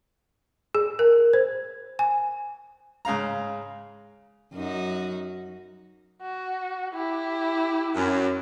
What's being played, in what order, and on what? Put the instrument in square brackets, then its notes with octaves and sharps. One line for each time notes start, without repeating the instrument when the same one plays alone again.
[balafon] G#4
A#4
C5
G#5
[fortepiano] G#2 C#3 F5 A#5
[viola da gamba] F#2 D#4 F#4
[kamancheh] F#4
E4 G4
[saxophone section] F#2